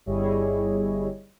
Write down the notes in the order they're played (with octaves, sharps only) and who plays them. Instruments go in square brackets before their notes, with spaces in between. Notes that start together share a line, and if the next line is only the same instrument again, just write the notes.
[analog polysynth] G1 G3 E4 G#4 C#5 D#5